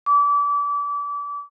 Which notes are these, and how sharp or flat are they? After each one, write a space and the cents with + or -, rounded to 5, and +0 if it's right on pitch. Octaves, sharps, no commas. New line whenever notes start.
D6 -30